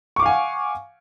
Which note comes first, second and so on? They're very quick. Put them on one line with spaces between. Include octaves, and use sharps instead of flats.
C#6 D6 F5 G#5 F#5